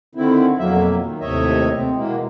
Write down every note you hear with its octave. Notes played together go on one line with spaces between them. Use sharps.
D3 D#3 C4 E4
F2 B2 F#3 A#3 E5
D#3
D#2 A2 C3 C#5 D#5 E5
C4
B2 E3 G#3 A#3